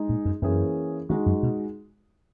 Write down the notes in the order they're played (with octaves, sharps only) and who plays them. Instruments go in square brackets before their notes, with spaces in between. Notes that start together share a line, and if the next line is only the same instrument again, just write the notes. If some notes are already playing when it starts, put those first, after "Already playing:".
Already playing: [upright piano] G#3 D#4 G#4
[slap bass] A#2
F#2
[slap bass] F#2 [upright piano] E3 A#3 C#4 G#4
[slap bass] D#3 [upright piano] G#3 D#4 F#4
[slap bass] F#2
B2